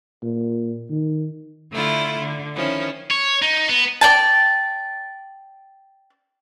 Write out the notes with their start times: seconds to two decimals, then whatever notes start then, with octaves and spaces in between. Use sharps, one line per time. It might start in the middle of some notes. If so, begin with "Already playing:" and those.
0.22 A#2
0.90 D#3
1.72 D3 A3 E4 F4
2.19 D3
2.55 D#3 F3 C#4 E4
3.11 C#5
3.42 D#4
3.69 B3
4.01 D5 G5 A5